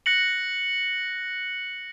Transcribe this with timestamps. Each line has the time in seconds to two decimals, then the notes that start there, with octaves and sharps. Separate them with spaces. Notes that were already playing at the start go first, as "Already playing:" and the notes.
0.06 F#6 A#6 C#7 F#7